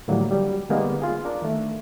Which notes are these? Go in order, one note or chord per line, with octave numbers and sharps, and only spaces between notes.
A2 D3 D#3 F#3 G3 A#3
F#3 G3
D3 G3 G#3 A#3 B3 D#4
F4 G#4
D4 A#4
D#3 A3